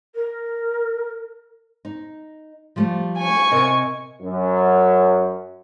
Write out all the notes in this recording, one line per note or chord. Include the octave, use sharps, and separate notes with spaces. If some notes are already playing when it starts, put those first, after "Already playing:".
A#4
D#4
F3 G3 A3
G#5 C#6
C3 A#4 D#5
F#2